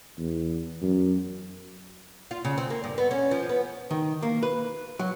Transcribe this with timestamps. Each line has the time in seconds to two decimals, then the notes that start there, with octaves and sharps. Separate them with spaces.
0.18 E2
0.82 F#2
2.31 F4
2.45 C#3
2.58 C4
2.70 A#3
2.84 G2
2.98 B3
3.11 C#4
3.31 F3
3.49 B3
3.91 D#3
4.22 A#3
4.43 B4
4.99 F#3